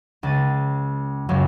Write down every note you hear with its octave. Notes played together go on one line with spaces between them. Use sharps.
C#2 A6 D#7
C#2 F#2 F#3